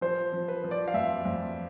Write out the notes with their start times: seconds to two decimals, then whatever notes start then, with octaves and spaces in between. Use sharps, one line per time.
0.01 F3 C5
0.32 F3
0.48 B4
0.64 F3
0.71 D5
0.88 F5
0.94 F2 E5
1.25 F2